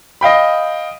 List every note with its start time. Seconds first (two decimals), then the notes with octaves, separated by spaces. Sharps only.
0.21 D#5 F5 G5 B5